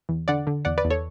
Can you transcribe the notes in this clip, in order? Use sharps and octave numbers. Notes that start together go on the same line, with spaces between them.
E2
D3 D5 F#5
D3
E2 D5 F#5
B4 D5
E2
A4 C#5